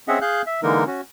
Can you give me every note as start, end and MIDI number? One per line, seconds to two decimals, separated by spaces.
0.08 0.19 60
0.08 0.19 61
0.08 0.19 68
0.08 0.19 75
0.08 0.19 76
0.08 0.19 78
0.21 0.42 68
0.21 0.42 77
0.21 0.42 90
0.21 0.42 91
0.46 0.61 76
0.63 0.84 50
0.63 0.84 52
0.63 0.84 56
0.63 0.84 58
0.63 0.84 63
0.63 0.84 70
0.87 1.01 61
0.87 1.01 66